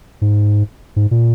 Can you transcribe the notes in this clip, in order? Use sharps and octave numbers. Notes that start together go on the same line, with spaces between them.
G#2
G#2
A#2